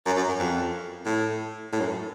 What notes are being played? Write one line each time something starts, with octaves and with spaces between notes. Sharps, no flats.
F#2
F#2
F#2
F2
A2
A2
F#2